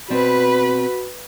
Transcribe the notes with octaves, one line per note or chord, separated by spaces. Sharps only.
B2 C4 F#4 B4 D5 B5